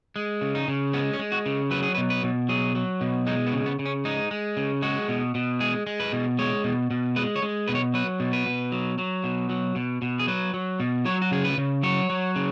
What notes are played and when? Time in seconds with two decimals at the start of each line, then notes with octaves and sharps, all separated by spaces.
0.16 G#3
0.41 C#3
0.55 D#4
0.68 C#3
0.93 G#3 B3
1.13 C#4
1.19 G#3
1.32 F#4
1.46 C#3
1.71 F#3 B4
1.83 G#4
1.95 B4
1.97 B2
2.10 B4
2.23 B2
2.49 F#3 G#4
2.75 F#3
3.01 B2
3.27 G#3 D#4
3.46 B3
3.53 C#3
3.66 B3
3.79 C#3
3.86 C#4
4.05 G#3 D#4
4.31 G#3
4.57 C#3
4.82 G#3 F#4
5.08 B2
5.35 B2
5.60 G#3 G#4
5.87 G#3
6.00 B4
6.13 B2
6.38 G#3 C#5
6.64 B2
6.91 B2
7.16 G#3 B4
7.36 C#5
7.42 G#3
7.68 B2 B4
7.75 C#5
7.94 F#3 B4
8.20 B2
8.33 B4
8.46 B2
8.72 F#3
8.98 F#3
9.24 B2
9.50 F#3
9.76 B2
10.02 B2
10.19 G#4
10.28 F#3 B4
10.54 F#3
10.80 B2
11.05 F#3 C#5
11.22 F#4
11.31 C#3 G#4
11.45 B4
11.58 C#3
11.83 F#3 C#5
12.10 F#3
12.36 C#3